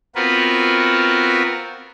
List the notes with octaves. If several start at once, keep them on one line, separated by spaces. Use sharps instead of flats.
B3 C4 F4 F#4 A#4 B4